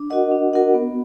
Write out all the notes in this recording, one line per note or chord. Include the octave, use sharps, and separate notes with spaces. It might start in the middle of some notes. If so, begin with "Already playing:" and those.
Already playing: D4
F#4 A#4 D#5 F#5
D4
F#4 A#4 D#5 F#5
B3